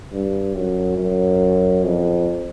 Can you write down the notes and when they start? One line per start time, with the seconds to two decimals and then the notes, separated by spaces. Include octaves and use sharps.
0.12 G2
0.55 F#2
0.98 F#2
1.85 F2